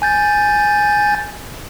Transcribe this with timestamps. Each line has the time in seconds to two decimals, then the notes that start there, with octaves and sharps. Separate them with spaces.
0.02 G#5 G6 A6